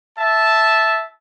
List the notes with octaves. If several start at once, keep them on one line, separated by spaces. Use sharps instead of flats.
E5 A5